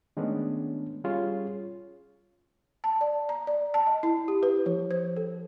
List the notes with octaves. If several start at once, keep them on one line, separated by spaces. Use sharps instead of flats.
D#3 G#3 A3 B3 C#4 D4
G3 C#4 F4 G#4 C#5
A5
D5
A#5
D5
A5
D#5
E4
G4
B4
F3
C5
A4